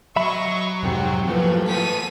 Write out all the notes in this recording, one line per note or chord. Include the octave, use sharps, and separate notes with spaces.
F#3 D#5 E5 B5 C#6
F#3
C2 F2 G#2 C3 F#4 G4
E3 F3 A3 A#3 G4 B4
B3 A4 B6 D#7